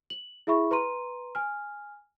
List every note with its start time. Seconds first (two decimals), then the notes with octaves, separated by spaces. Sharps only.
0.10 F#7
0.47 E4 G#4 E5 B5 C#6
0.71 B4 A#5 C6 D#7
1.35 G#5 F6